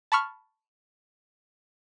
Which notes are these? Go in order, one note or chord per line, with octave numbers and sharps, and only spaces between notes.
A5 B5 C#6 F6